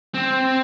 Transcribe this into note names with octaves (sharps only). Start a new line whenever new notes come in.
C4